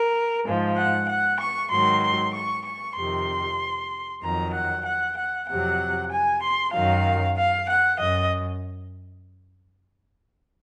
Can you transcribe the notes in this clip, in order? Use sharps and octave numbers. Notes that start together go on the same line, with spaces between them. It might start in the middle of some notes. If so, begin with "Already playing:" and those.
Already playing: A#4
G#2 F3
F#5
F#5
C#6
G#2 D#3 F#3 C6
C6
C#6
C#6
F2 C3 D#3 C6
F2 D#3 F#3 A#5
F#5
F#5
F#5
F2 C3 F#3 F#5
G#5
C6
F#2 D#3 F#3 F5
F5
F#5
F#2 D#5